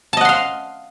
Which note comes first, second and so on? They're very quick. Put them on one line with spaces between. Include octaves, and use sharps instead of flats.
A5 D#5 F#5 C6 F5